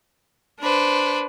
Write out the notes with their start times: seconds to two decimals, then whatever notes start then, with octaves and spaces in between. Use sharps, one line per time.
0.61 D4 B4 C5